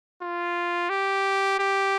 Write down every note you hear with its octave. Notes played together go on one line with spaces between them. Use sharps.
F4
G4
G4